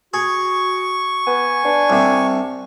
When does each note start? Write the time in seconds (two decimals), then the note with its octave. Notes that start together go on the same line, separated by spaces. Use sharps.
0.14 F#4 G#4 C#6
1.27 B3 G#5
1.65 D4
1.90 C2 C3